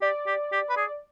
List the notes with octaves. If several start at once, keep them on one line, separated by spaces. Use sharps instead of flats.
G4 D5
G4
G4
B4
G#4